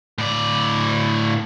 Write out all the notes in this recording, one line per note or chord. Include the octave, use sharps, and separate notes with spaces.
A2 D5